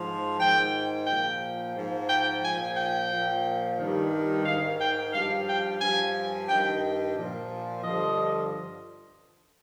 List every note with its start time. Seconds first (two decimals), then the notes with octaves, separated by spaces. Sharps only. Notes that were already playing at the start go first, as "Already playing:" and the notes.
Already playing: G#2 F3
0.39 G#2 D#3 G5
1.07 A#2 F3 G5
1.75 G#2 F3
2.09 G5
2.42 A#2 F3 G#5
2.77 G5
3.10 A#2 F3
3.78 G2 D#3
4.45 G#2 D#3 F5
4.79 G5
5.13 G2 F3 F5
5.47 G5
5.80 G2 F3 G#5
6.48 G2 D#3 G5
7.16 A#2 F3
7.83 G2 D3 F3 D#5